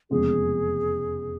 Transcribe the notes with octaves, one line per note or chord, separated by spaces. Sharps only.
F1 E2 C#3 F3 G#3 G#4